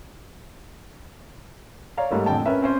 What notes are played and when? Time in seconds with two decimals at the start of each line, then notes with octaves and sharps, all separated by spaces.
1.97 C#5 D5 F5 A#5
2.10 G#2 G3 A3 A#3
2.26 F2 A2 D3 G5 A5
2.46 C#4 A#4 B4 E5
2.62 C4 C#4 C5